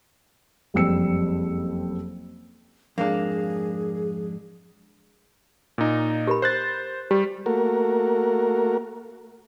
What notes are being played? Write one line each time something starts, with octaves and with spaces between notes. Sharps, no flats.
F#1 F2 G3 C4 E6 C#7
F2 G#2 A#3 D4 G#4
A#2 D#4
G4 A#4 B5
C5 F#6 A6
G3 G4
A3 A#3 F#4 A#4